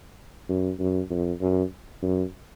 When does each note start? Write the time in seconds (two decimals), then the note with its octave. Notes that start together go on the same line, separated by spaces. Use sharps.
0.49 F#2
0.80 F#2
1.11 F2
1.41 F#2
2.03 F#2